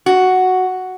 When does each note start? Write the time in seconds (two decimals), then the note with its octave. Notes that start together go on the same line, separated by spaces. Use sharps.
0.06 F#4